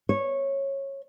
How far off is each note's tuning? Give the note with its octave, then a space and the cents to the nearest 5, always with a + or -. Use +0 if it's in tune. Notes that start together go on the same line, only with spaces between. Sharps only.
C#5 -15